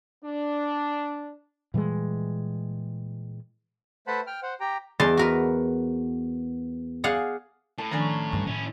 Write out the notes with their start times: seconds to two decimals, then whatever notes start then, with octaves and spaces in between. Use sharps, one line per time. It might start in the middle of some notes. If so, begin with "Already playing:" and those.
0.24 D4
1.74 A#2 E3 G3 G#3
4.07 A3 B4 C5 F#5 A5 B5
4.27 G5 F6
4.42 C5 F#5
4.60 G4 G5 A#5
5.00 E2 D5 D#5 A5 C6
5.17 F#4 A#4 B4
7.04 G#4 D5 F5 F#5
7.78 A2 A5
7.91 D#3 F3 C#4 D4 A#5
8.33 G2 E3
8.47 A2 C#4 E4